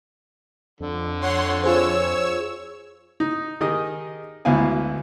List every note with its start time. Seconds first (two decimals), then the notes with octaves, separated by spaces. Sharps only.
0.80 F2 D3
1.21 C#5 F#5 C6
1.64 F4 G#4 C5 C#5 E6
3.20 D#4
3.61 D#3 G4 G#4 D#5
4.45 G#1 D2 B3 E4 F5 G#5